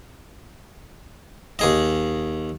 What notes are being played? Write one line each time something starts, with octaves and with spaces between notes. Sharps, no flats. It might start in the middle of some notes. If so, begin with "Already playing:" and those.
D#2 G#4 D#5